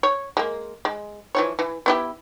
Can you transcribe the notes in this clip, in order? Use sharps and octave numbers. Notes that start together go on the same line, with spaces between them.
C#5
G#3 A#3
G#3
E3 F3 C#5
E3
B3 E4 G4